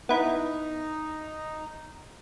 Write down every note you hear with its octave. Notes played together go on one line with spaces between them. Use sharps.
B3 D#4 E4